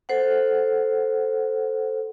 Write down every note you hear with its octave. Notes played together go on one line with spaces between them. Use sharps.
A4 C5 F#5